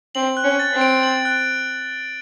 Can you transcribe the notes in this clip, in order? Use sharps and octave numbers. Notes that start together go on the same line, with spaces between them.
C4 F#7
F#6
C#4
A6
C4
D7
F#7
F#6